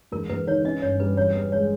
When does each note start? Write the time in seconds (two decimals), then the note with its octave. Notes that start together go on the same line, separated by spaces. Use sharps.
0.12 E1 A#4
0.29 E1 B4
0.47 D#3 C#5
0.65 C#4 D#5
0.82 G1 C#5
1.00 G3 B4
1.17 E2 C#5
1.35 E2 B4
1.52 G#3 C#5